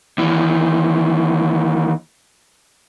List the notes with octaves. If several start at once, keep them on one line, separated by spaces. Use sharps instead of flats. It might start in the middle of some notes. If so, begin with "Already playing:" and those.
D#2 E3